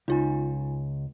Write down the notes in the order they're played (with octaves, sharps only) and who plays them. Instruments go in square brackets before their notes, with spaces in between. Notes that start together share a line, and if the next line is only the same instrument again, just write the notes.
[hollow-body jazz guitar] C#2 [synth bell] D#4 F4 G#5